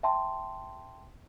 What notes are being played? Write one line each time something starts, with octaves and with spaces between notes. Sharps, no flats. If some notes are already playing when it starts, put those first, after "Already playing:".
E5 G5 A5 C6